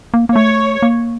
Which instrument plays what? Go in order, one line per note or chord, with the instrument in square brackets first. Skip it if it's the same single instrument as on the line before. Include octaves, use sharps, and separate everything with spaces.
[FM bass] A#3
A#3
[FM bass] A3 [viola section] C#5
[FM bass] A#3